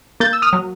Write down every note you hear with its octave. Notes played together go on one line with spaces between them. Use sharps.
A#3 G6 A6
E6
D#6 F6
F#3